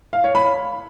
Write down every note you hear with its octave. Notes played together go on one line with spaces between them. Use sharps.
F5
C#5
B5